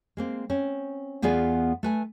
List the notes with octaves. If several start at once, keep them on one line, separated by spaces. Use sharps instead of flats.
G#3 A#3 C4
C4 C#4
E2 B3 F4 G#4 D5 G#5
A3 B4 G#5